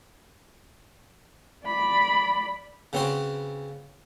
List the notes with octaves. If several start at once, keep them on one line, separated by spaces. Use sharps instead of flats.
D5 B5
C#3 B3 C4 F#4 C6